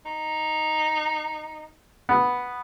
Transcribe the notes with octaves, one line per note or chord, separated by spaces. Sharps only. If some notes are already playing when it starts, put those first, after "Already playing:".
D#4
B3